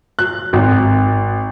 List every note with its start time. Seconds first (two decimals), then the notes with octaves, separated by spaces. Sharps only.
0.19 F#6
0.53 G#1